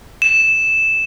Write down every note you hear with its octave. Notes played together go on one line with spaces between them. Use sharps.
E7